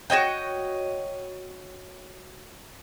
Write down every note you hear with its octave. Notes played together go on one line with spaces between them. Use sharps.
F#4 C#5 D#5 G5